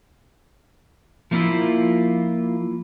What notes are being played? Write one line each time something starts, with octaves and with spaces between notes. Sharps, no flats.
F3 A3 A#3 C#4 E4 F4